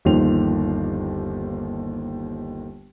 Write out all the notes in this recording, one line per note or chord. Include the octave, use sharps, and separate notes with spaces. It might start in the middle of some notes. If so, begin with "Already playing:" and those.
G1 D#2 D#3 F3 C5 F7